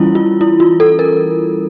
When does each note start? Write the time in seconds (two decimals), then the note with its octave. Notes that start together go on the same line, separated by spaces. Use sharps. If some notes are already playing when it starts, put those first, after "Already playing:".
Already playing: E3 G3 C#4 E4 F4
0.15 F4
0.41 E4
0.60 F4
0.80 A4
0.99 A#4